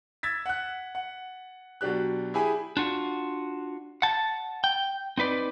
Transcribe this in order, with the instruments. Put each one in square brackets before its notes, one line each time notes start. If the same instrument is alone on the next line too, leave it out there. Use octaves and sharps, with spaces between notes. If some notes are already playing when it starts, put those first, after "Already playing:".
[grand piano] E6 G#6 A6 B6
F#5 F#6
F#5
B2 F#3 D4 G4 F#6
E4 G4 G#4 G#5 B5
[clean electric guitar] D4 F4 F#4
F#5 A5
G5
C4 D#4 B4 D5